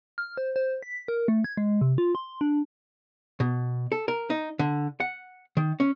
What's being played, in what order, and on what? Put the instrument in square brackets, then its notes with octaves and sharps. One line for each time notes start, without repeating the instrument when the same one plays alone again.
[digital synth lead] F6
C5
C5
B6
A#4
A3
G#6
G#3
C3
F4
C6
D4
[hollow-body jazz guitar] B2
A4
A#4
D#4
D3
F#5
D#3
C#4